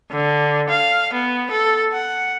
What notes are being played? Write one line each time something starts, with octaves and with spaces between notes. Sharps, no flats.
D3
F5
B3
A4
F#5